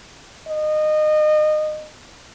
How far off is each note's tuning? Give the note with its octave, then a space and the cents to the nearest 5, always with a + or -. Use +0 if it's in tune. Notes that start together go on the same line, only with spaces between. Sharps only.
D#5 -25